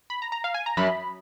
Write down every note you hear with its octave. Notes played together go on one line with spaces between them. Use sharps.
B5
A#5
A#5
F5
G#5
A#5
F#2 B5